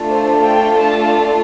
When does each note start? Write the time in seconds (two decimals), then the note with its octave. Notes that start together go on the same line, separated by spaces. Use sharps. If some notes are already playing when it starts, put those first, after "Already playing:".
Already playing: A3 D4 F4 A4
0.10 C5
0.44 G5
0.79 A5